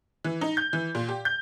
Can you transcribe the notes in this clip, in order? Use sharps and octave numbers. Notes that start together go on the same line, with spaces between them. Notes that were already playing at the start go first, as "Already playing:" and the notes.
E3
D#4
G6
E3
A#2
G4
G6